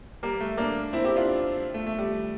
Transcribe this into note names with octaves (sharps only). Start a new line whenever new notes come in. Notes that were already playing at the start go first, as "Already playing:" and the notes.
G3 A#3
A3
A#3 D4
C4 E4
E4 G4
D4 F4
A3
A3
G3